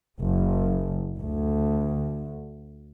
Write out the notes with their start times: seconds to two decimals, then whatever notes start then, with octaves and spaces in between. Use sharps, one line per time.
0.19 F#1
1.18 D2